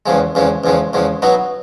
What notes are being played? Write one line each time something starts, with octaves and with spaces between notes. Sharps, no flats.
E2 C#3 F3 G#3
E2 C#3 F3 G#3
E2 C#3 F3 G#3
E2 C#3 F3 G#3
B2 F#3 B3 D#4